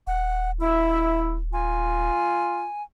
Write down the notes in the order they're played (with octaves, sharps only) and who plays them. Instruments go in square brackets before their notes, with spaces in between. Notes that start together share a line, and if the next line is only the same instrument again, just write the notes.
[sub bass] D#1 [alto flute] F#5
[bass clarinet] E4 [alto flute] E5
[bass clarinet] F4 [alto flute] G#5